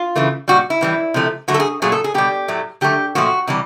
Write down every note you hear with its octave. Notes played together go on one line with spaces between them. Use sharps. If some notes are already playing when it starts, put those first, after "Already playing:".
Already playing: F4
C#3 E3 A3
A#2 G3 F#4
E4
A2 E3 G3
C3 F3 A3
D3 F#3 A3 F#4
A4
G#4
A#2 F#3 A3 G#4
A4
G#4
B2 G3 G4
A2 F#3 A3
D3 F#3 A3 G4
A#2 F3 A3 F#4
C3 E3 G3